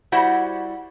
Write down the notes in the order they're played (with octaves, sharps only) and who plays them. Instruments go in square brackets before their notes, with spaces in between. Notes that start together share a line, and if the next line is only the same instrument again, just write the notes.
[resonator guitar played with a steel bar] G3 E4 F#4 C5 F#5